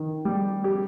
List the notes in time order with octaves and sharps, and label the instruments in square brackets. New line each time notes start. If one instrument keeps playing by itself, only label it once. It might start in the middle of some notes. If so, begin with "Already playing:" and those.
Already playing: [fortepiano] D#3
G3
G4